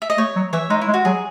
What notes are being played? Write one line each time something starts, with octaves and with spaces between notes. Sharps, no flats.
E5
D#5
A3 C#5
F#3
E3 C#5 E5
G#3 D#4
E4
G#3
F#4
F#3 G#4